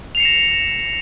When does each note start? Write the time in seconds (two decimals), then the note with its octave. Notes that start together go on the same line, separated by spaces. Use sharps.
0.15 F7
0.17 C7
0.20 C#7
0.23 E7
0.25 A#6